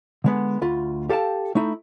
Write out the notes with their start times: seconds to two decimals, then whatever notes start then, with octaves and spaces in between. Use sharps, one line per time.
0.24 D3 G#3 B3
0.61 D2 F4 B5
1.09 G4 A4 F5 G5 A5
1.55 A3 D#4 E4